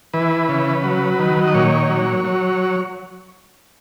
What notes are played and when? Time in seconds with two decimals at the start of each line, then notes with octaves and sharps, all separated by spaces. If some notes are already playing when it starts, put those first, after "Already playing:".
0.14 E3 B4
0.48 C#3
0.84 F#3
1.19 D#3
1.48 D#5
1.54 A#2 C#5
1.90 F#3
2.25 F#3